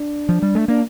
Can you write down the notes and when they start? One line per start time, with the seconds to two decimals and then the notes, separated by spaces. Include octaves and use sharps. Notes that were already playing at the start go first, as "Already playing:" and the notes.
Already playing: D4
0.29 F3
0.42 G3
0.55 A3
0.68 A#3 D4